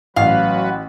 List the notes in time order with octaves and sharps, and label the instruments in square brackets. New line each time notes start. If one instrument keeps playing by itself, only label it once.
[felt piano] A1 [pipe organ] F#3 F#4 B4 [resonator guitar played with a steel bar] F5